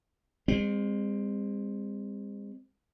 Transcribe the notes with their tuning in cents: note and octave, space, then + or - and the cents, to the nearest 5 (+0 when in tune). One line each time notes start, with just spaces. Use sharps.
G#3 -40 C4 +0